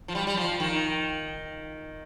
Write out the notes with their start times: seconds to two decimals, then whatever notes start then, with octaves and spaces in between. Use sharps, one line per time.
0.08 F3
0.15 G3
0.27 G3
0.37 F3
0.60 D#3